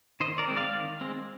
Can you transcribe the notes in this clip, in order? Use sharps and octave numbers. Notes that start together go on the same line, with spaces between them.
D#3 C5 D#5
A#4 D5
G#3 C4
D5 F5
D#3
G#3 C4